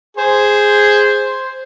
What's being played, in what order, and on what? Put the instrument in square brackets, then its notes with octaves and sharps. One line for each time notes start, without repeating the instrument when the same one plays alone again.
[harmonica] G#4 [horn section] C5